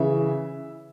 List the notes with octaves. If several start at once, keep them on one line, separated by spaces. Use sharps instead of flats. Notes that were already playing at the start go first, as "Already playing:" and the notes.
Already playing: C#3 E3 E5